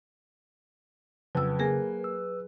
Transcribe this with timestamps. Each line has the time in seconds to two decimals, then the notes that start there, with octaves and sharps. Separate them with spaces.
1.35 F2 C#3 F#3 B4 E6
1.59 A#3 G#4 G#5 A#6
2.04 E6